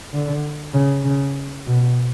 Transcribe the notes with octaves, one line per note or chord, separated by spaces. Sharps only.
D3
C#3
C#3
B2